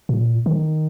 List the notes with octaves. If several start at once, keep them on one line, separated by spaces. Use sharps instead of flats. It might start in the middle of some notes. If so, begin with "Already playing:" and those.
A#2
D#3